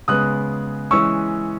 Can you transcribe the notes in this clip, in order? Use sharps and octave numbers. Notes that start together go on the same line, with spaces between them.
C#3 G#3 B3 D#6 F#6
E3 G#3 C#4 C#6 E6